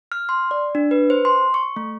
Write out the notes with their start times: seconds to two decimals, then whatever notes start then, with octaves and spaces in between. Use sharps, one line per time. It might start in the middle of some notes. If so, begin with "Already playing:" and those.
0.12 F6
0.29 C6
0.51 D5
0.75 D4
0.91 B4
1.10 C5
1.25 C6
1.54 C#6
1.76 A3